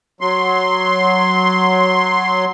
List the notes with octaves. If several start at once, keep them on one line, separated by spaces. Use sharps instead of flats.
F#3 C6